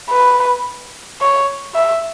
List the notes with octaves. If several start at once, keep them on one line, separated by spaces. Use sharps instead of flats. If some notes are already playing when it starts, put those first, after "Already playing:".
B4
C#5
E5